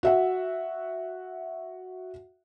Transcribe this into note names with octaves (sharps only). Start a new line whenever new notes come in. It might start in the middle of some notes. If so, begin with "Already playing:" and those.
F#4 E5 F#5